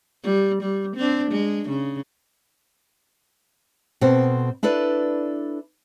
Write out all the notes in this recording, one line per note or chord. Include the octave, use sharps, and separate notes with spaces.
G3
G3
C4 D4
G#3
C#3
B2 C4 A4 C5
D4 E4 A4 B4 D5